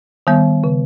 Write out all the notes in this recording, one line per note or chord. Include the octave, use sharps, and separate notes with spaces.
D#3 G3 B3
C#3